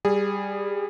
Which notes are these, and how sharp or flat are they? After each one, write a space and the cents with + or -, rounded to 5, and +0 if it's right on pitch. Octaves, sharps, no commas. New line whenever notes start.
G3 +10 G#4 -15